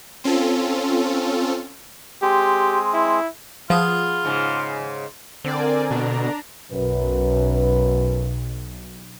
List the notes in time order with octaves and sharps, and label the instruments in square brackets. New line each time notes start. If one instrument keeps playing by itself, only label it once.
[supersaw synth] C4 C#4 F4 A4
[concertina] G#3 C4 G#4 [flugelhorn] G4
[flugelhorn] E4
[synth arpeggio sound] F3 [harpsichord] B3 G#4 [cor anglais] F4
[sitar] G#2 C#3
[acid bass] D3 [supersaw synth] C4 D5 [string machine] A#4 G#5
[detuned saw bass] B2 [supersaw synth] D4 [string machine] A#5
[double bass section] B1 [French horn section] F#2 B4